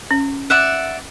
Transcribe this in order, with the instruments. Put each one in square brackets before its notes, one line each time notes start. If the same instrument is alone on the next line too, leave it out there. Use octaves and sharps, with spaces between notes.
[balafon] C#4
[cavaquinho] D5 E5 F#5